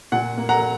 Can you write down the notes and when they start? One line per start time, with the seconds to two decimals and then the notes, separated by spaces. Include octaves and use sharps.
0.12 A#2 F#5
0.38 A#3
0.49 F#5 A#5